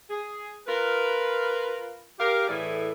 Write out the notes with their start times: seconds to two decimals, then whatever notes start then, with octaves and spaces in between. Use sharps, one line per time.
0.10 G#4
0.67 F4 A#4 B4
2.18 G4 A#4 F5
2.48 A2 E3 A3 E4 G#4 D5